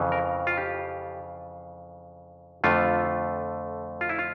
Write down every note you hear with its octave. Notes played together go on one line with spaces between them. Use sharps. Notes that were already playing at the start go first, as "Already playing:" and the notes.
Already playing: F2 C#3 E3
A#4
F4
G4
F2 D3 A3 F4
F4
E4
F4